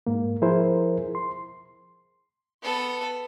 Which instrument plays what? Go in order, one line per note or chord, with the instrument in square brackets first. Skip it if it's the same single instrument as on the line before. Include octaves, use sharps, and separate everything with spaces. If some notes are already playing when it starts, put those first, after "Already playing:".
[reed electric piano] G#2 A#3
F3 E4 G#4 A#4 C5
C6
[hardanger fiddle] B3 A4